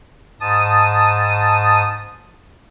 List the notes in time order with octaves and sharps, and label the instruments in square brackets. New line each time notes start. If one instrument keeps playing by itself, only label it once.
[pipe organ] G#2 A5 D#6